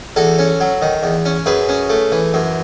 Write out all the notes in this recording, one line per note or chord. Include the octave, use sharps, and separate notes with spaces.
E2 F#4 A4
C#4
F#3
D#3
E2
C#4
F#2 G#4 B4
C#4
A3
E3
F#2